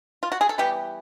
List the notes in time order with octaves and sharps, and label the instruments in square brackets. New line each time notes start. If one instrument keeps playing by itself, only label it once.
[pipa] F4
F#4
G#4
A4
E3 G3 B3 G4